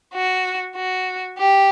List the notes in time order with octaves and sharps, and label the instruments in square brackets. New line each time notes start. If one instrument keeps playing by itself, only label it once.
[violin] F#4
F#4
G4